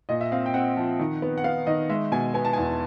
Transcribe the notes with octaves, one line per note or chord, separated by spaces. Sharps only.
A#2 D#5
E5
C4 F5
G5
C4 F#5
F3
D#3
B3
F#5
B3 F5
D#3 D#5
G#3 E5
B2 G#5
B3 G#5
A5
E2 G#5